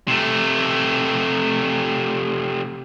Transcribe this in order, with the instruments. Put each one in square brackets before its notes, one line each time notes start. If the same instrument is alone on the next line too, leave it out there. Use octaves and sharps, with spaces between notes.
[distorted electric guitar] C3 A3